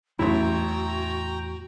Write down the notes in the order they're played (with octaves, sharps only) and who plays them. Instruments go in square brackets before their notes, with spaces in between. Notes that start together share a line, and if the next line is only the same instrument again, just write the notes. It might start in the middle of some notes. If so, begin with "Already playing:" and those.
[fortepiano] A1 E4 [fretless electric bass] E2 A2 F#3 [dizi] F#4 [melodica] G5 A#5